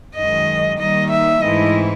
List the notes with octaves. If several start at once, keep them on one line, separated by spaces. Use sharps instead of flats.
F#2 D#3 G#3 D#5
D#3 G3 A#3 D#4 D#5
E5
G#2 E3 A3 C4 E4 D#5